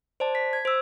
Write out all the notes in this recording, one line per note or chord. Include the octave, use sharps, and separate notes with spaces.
C5 D5 A5
B6
G#6
C5 E6